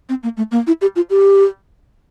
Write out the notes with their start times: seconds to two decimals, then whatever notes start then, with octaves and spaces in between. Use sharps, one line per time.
0.09 C4
0.23 A#3
0.37 A3
0.51 A#3
0.67 E4
0.81 G4
0.96 F4
1.10 G4